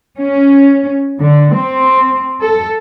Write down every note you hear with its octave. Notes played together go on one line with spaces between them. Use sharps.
C#4
D3
C4
A4